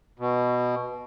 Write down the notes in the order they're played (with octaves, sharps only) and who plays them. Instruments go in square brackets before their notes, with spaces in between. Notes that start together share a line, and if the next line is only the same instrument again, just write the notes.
[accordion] B2